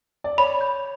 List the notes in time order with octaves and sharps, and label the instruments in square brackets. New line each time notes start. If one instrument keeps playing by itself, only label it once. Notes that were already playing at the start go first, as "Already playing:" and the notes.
[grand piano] D5
[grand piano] C#5 [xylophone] B5
[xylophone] G6